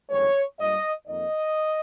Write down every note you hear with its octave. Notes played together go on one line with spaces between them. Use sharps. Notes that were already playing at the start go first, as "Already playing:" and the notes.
G1 F2 D#3 G#3 C#5
G2 G3 A#3 F4 D#5
F2 D#3 A#3 D#5